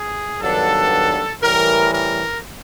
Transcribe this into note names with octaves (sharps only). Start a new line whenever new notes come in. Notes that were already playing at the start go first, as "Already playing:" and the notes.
Already playing: G#4
G2 D#3 F#3 B3 D4 A4
A2 E3 G3 A#4
A#4